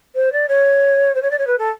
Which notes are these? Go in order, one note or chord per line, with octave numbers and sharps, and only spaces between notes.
C5
D5
C#5
C5
C#5
D5
C#5
B4
A4